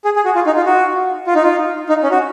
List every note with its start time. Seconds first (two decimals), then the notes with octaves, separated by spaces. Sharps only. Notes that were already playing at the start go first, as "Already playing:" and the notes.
0.05 G#4
0.16 G#4
0.25 F#4
0.35 F4
0.46 D#4
0.56 F4
0.66 F#4
1.27 F4
1.35 D#4
1.42 F4
1.89 D#4
2.03 C#4
2.11 F#4